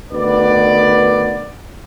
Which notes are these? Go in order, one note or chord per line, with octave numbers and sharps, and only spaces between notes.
D2 D#3 B3 B4 D5